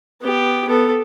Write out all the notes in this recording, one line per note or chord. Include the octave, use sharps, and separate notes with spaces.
B3 G4
B3 A4